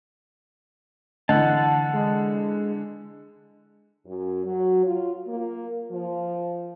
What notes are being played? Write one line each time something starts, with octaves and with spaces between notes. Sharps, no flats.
D3 E3 D#5 F#5 A5
G#3
F#2
F#3
F4
A#3
F3